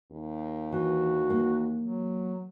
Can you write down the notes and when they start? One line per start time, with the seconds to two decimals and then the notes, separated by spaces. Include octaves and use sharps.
0.11 D#2
0.72 E3 F#4
1.30 A#3
1.81 F#3